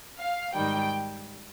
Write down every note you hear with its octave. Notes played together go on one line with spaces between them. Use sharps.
F5
G#2 D#3 G3 G5